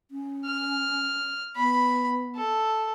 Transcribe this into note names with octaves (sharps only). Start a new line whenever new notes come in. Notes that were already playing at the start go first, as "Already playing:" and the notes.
C#4
F6
B3 B5
A4